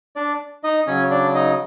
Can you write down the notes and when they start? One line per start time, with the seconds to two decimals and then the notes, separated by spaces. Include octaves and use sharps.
0.16 D4 D5
0.64 D#4 D#5
0.87 C#3 F#3 C#4 C#5
1.10 D4 D5
1.35 D#4 D#5